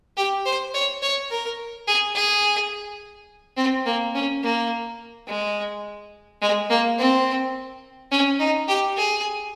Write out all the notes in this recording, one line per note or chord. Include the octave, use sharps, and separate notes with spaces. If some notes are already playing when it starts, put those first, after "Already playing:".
G4
C5
C#5
C#5
A#4
G#4
G#4
C4
A#3
C#4
A#3
G#3
G#3
A#3
C4
C#4
D#4
G4
G#4